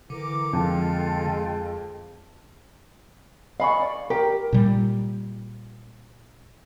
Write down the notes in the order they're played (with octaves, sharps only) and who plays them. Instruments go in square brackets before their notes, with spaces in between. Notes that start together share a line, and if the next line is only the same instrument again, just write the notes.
[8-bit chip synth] D3 [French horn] E3 [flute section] A#4 D6
[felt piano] F2 [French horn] G#3 [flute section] F4 A4 G5
[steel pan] D#5 G#5 C#6 [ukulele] F5 B5
[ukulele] D5
[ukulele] G4 [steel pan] A#4
[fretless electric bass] A#2 G3